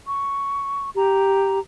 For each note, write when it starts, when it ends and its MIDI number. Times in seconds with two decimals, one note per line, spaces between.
0.06 0.91 85
0.96 1.59 67
0.96 1.59 82